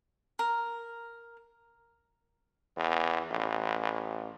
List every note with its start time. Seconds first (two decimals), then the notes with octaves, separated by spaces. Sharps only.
0.39 A#4
2.77 E2
3.31 A1